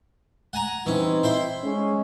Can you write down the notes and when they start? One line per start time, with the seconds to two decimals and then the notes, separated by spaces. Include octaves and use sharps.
0.53 F#5 G#5 A#5
0.86 E3 G3 C4 C#4 D#4
1.23 E4 C5 C6
1.62 G#3 C#4